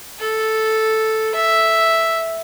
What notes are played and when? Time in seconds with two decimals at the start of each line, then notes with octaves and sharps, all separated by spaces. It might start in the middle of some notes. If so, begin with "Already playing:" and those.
0.20 A4
1.35 E5